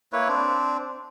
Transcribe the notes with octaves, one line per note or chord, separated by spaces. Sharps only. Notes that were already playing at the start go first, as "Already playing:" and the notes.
A#3 E4 B4 C#5
C4 D4